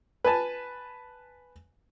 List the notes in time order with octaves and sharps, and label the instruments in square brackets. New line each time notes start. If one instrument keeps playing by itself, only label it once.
[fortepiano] B4 G#5 A5